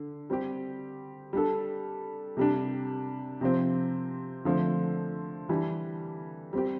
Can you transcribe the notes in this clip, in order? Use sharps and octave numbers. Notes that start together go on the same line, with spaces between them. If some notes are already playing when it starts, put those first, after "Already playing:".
Already playing: D3
G3 C4 G4
G3 D4 A4
C3 G3 D4
C3 F3 C4
D3 F3 A3 C4
E3 G3 D4
G3 C4 G4